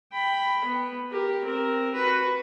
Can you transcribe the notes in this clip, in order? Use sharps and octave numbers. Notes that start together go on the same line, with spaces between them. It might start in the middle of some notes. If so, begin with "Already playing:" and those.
G5 B5
B3
G4 A#4
C4 A#4
F#4 B4